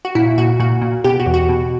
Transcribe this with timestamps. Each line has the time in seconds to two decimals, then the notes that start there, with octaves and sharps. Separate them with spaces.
0.05 F#4
0.15 A#2 E4
0.38 A#2 F#4
0.60 A#2 F#4
0.82 A#2
1.04 B2 G4
1.20 F#4
1.26 E2
1.34 F#4
1.49 B2